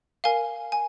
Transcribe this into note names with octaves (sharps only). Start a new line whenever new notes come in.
A#4 F5 G#5
G#5